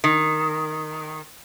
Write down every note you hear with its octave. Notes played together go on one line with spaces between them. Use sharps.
D#3